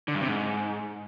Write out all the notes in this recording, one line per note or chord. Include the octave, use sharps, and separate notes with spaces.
D3
G2
C3
G#2